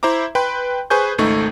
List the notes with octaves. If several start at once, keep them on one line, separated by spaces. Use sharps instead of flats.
E4 C5 E5 A#5 D6
B4 G5 B5 C6
G#4 B4 C5 G#5 C#6 G6
G#1 C#2 A3 D#4 C#6